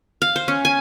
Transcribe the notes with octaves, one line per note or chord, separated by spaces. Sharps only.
F5
C5
C#4
G#5